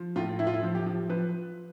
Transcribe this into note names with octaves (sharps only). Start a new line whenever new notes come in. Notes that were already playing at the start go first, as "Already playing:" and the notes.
Already playing: F3
A2 F4
A2 E4
F4
E4
F3
G4
F3
F3 B4